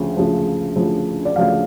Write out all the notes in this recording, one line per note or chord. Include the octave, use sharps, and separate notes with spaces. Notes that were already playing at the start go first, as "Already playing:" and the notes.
Already playing: D2 C#3 F3
D2 C#3 F3
D2 C#3 F3
D5
D2 C#3 F3 F5